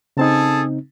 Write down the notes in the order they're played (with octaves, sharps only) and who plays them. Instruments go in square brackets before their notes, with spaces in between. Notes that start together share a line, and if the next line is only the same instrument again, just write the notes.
[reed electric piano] C#3 C4 D#4 [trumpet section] G#4 A4 A5